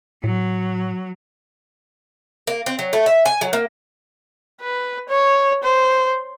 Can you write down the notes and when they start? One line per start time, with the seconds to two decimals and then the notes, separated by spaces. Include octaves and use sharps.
0.24 A2 F#3
2.47 A#3
2.66 C4
2.79 F#3
2.93 A3
3.06 E5
3.26 G#5
3.41 F#3
3.53 A#3
4.61 B4
5.09 C#5
5.64 C5